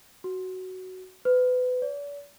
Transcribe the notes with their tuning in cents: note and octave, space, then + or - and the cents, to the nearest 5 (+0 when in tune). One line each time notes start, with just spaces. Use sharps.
F#4 +5
B4 +30
D5 -40